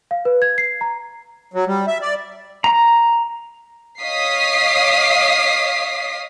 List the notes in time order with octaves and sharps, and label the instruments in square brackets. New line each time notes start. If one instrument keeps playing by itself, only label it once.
[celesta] F5
B4
G#6
C7
A#5
[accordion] F#3
G3
E5
D5
[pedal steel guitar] A#5
[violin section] C#5 D#5 F5 D#6 B6 C7